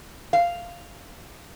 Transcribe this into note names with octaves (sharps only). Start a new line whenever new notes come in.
F5